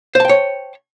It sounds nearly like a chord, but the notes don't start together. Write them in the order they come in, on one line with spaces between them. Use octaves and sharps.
C5 A5 G5 C#5